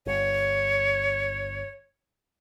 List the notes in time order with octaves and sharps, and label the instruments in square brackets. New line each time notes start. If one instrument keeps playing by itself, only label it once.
[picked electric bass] G1 [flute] C#5